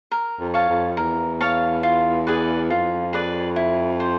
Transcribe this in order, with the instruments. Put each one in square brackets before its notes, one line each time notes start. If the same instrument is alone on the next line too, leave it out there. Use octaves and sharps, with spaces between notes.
[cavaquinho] A#4
[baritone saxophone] F2
[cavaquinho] C#5 F5 A5
[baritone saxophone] F2
[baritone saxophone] E2 [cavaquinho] A#4
[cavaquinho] C#5 F5 A5
F4
G#4 B4 D5
[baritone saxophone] F2 [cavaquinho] F4
[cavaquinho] G#4 B4 D5
E4
C5